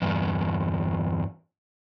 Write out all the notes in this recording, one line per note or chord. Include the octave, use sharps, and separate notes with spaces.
E2 G2